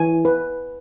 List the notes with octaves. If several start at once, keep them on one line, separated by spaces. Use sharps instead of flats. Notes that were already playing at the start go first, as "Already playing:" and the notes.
Already playing: E3 G#5
B4